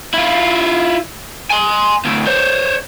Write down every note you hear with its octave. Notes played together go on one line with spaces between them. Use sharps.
E4 F4
G#5 C6
D2 A2
C5 C#5